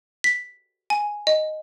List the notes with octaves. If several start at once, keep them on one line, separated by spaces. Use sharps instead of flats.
B6
G#5
D#5